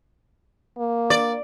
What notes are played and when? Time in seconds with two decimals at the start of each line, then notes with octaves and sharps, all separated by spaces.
0.78 A#3
1.10 D5